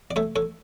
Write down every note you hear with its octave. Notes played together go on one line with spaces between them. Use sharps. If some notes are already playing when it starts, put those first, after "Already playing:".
D5
A3 A4 C#5
A4 C#5